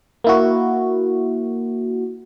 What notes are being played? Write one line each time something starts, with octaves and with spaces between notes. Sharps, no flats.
A#3 E4 F#4